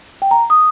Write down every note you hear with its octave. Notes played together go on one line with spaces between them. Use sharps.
G5
A#5
D#6